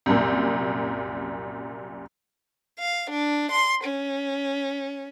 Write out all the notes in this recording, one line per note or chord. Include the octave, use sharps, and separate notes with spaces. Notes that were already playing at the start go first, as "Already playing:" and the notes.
C2 F#2 A#2
F5
D4
C6
C#4